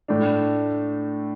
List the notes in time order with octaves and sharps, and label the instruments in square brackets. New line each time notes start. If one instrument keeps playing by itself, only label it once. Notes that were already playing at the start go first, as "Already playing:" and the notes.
[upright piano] A2 A3 D4